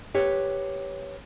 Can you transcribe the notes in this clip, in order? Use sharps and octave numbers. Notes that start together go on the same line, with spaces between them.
G4 B4 C#5